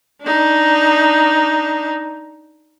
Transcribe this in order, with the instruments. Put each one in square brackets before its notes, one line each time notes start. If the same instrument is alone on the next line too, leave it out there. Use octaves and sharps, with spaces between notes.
[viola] D4 D#4